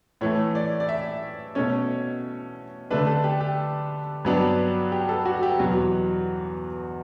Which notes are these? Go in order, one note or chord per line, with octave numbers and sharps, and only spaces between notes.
A2 E3 A3 C#5
D5
D5
E5
B2 A3 C#4 C#5
D3 A3 D4 B4
A4
G4
G4
G2 F#3 B3 D4
G4
A4
F#4
G4
E2 B2 F#3 F#4